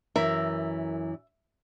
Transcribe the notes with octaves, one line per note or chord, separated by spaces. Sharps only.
F#2 E3 A#4 E5